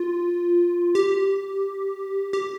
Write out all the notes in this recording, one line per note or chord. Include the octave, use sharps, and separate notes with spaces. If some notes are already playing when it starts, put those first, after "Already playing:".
Already playing: F4
G4
G4